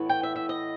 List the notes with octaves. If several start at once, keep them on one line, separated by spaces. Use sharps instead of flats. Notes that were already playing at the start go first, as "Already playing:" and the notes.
Already playing: A2 E3 B3
G5
E5
E5
D#5